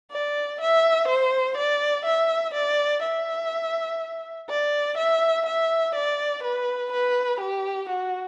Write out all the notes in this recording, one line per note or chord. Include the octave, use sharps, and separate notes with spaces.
D5
E5
C5
D5
E5
D5
E5
D5
E5
E5
D5
B4
B4
G4
F#4